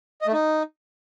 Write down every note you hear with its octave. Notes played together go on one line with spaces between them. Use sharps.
D#5
A3
D#4